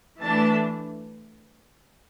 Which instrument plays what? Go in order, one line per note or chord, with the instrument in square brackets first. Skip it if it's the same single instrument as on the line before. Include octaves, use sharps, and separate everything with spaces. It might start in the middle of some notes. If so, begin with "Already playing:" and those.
[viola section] E3 A3 D4 A5